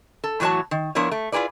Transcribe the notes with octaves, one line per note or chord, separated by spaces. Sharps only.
A4
A2 E3 F#3 F#4 C#5 A5
D#3
F3 B3 D4 E4 A#4 C#5
A3
E4 F4 G#4 B4 D5